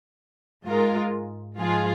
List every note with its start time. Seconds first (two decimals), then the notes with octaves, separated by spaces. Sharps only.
0.66 G#2 G#3 F4 A#4
1.57 G#2 F3 G#3 F4 G#4